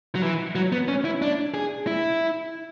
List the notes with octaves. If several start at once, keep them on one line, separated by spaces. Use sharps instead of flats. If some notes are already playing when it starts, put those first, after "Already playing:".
F#3
E3
F#3
B3
C#4
E4
D4
G#4
E4